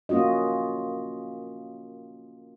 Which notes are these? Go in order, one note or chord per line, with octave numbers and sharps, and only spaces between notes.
A#3 C#4 F4 F#4 D#5